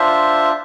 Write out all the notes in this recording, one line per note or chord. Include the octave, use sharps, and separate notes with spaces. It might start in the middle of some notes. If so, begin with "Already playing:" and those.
Already playing: D4 F4 C5 E5